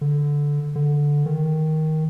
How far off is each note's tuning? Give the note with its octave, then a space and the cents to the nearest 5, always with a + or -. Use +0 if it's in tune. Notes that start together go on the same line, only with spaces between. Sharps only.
D3 -10
D3 -5
D#3 +10